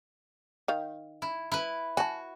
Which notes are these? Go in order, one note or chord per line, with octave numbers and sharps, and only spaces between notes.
D#3 F5
E4
E4 B4
F#4 G#5 A5